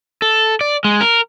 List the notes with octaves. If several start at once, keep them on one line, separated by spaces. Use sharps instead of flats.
A4
D5
G#3
A#4